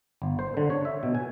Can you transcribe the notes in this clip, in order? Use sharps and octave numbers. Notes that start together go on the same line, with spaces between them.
G1
C5
D3
C#5
E5
B2
G#5